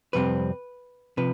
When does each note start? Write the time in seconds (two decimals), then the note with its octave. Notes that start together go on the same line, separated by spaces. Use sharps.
0.13 F2 C3 G3 C4 B4
1.17 C3 F3 B4